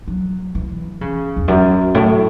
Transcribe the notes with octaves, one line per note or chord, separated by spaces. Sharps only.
F#3
E3
C#3
E2
F#2
A2